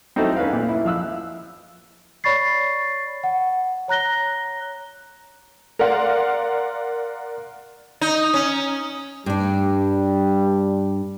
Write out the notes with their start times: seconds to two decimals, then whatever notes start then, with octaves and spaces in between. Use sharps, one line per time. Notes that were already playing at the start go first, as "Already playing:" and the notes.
0.16 C4 D#4 E4 F#4 A4 C5
0.36 C#4 B4 F5
0.53 A#2
0.69 E4
0.85 F3 F5 E6 F#6
2.24 C#5 D5 B5 C#6 A6 C7
3.24 F#5
3.88 C#5 A#5 F#6 A#6 G7
5.79 A#4 D5 F5 F#5 C6
8.01 D#4
8.34 C#4
9.26 G2 G3 D4